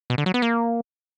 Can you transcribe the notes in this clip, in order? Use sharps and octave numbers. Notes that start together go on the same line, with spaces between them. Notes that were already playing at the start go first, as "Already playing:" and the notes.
B2
D3
F#3
B3
A#3